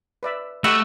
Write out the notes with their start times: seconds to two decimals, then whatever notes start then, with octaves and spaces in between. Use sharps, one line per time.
0.23 B4 D5 E5
0.64 A3 F#4 G4 D#5 B5 E6